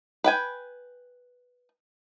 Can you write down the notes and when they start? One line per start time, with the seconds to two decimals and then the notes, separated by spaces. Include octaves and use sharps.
0.24 B4 G5 G#5